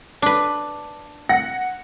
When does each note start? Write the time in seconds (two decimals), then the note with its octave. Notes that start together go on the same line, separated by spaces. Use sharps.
0.22 D4 B4
1.29 F#5 A#6 C#7